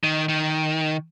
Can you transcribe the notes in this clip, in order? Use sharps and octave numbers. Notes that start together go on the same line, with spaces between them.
D#3
D#3